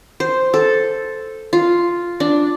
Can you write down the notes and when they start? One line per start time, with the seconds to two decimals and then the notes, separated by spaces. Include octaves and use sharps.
0.20 C5
0.54 A4
1.53 F4
2.20 D4